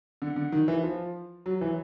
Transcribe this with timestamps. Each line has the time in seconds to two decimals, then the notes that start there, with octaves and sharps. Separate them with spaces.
0.22 D3
0.36 D3
0.52 D#3
0.68 E3
0.83 F3
1.46 F#3
1.61 E3